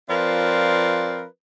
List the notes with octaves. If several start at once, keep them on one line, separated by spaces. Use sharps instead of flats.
F3 C4 F4 A#4 B4 D5